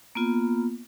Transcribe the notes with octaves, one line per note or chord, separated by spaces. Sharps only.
A#3 B3 F4